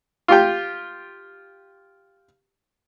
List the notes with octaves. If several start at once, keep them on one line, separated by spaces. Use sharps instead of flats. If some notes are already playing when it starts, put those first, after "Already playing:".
F4 G4 G5